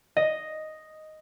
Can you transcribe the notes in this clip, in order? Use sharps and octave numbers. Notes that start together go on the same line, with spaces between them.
D#5